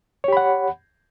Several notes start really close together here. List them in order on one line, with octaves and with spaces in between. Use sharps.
C#5 G4 B5 F#5